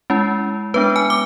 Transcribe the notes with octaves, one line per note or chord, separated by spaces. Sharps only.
G#3 C#4 E4
G#3 B3 D4 B4
G#5
D6